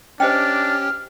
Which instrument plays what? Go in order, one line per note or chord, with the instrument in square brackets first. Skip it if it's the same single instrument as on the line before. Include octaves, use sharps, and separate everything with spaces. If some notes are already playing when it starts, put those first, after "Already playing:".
[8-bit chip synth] C#4 G4 [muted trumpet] D4 [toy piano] C5 D#5 G5 [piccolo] F6